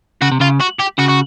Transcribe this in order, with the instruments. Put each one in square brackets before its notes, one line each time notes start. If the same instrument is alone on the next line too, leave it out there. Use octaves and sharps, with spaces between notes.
[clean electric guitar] C#3 [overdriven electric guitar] F#4
[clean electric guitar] C3
[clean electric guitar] C#3 [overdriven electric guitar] F4
[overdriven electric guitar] F#4
G4
[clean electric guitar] C#3 [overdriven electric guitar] F#4
[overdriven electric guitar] F#4